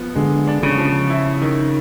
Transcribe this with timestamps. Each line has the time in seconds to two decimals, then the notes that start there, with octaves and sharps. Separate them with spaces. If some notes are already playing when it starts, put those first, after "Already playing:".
Already playing: F3 B3
0.15 D3 G#3
0.47 D4
0.63 C#3
0.78 F3
1.10 E4
1.42 D#3